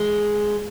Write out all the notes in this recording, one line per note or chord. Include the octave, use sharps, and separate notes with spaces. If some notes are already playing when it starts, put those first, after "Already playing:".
Already playing: G#3